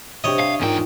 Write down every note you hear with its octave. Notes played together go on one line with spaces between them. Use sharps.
C3 D4 G4 C#5 D#5 E5
C3 F5
E2 G#2 A#3 D4 D#4 F4 G5